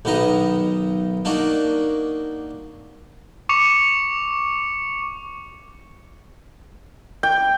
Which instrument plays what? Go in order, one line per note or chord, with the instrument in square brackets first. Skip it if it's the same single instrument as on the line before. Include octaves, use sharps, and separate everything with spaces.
[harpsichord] B1 D#3 B3 D#5 A#5
A#3 D4 D#4 F#4
[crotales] C#6 D6 C#7 F7
[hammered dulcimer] G5